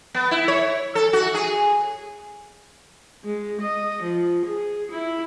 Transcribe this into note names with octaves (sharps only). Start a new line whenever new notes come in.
B3
E4
C#5
A4
F#4
G#4
G#3
D#5
F3
G#4
E4